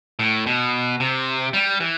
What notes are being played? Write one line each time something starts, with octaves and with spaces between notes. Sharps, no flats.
A2
B2
C3
G3
E3